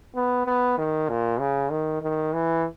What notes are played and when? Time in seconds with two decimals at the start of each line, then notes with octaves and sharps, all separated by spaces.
0.15 B3
0.46 B3
0.78 D#3
1.09 A#2
1.40 C#3
1.71 D#3
2.02 D#3
2.33 E3